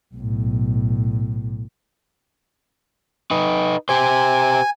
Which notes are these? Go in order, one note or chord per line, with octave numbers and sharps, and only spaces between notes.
B1 A2
D#4 B4
G4 C5 G#5